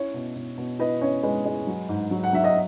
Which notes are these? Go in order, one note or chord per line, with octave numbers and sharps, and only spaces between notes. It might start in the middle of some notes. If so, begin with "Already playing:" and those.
Already playing: C#4 E4 C#5
B2
B2
B2
E3 B4 D#5
C#4 C#5
G#3 B4
G#3
F#3
G#2
F#3
F#5
F#3 E5
D#5